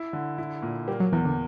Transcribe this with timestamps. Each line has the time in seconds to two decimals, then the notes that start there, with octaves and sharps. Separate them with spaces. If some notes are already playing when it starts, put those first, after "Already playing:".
Already playing: E4
0.13 D3
0.38 E4
0.62 A#2
0.88 G3 A#3
1.00 F#3
1.12 E2 E3
1.25 D3